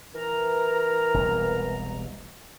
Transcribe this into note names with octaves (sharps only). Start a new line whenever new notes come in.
E3 A#4 A#5
E1 C2